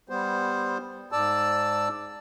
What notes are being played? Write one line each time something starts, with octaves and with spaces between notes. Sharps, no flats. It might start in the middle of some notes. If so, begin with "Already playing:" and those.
G3 B3 C5
G#2 D5 A5 E6